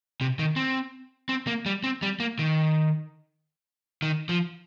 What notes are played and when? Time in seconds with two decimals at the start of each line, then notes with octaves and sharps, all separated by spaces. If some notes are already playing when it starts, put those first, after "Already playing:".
0.21 C3
0.39 D#3
0.56 C4
1.29 C4
1.47 A#3
1.66 G3
1.84 C4
2.02 G3
2.20 A#3
2.39 D#3
4.02 D#3
4.29 F3